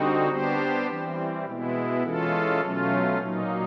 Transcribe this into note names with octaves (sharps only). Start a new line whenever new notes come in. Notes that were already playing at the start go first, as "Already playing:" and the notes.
Already playing: D3 G3 C4 D#4 F#4
G3 B3 D4 G4 C5
E3 G3 C4
B2 G#3 B3 E4
E3 G#3 C#4 F4 A4
B2 F#3 A3 C#4 F4
A#2 F#3 A#3 D#4